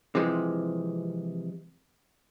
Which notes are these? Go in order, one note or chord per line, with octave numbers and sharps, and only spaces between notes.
C3 E3 F3 G#3